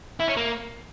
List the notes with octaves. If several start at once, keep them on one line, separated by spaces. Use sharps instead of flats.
E4
C#4
A#3